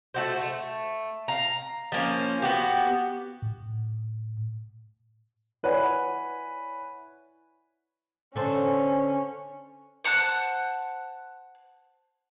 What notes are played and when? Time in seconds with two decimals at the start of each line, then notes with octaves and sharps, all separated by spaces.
0.14 A3 F#4 C5
0.41 A3
1.28 F5 A#5
1.92 F3 A#3 C#4
2.42 B3 F#4 G4
3.42 A2
5.63 E4 B4 C#5 D5 F#5 G#5
8.36 D3 C#4 A4 C5
10.04 C5 F#5 A5 F#6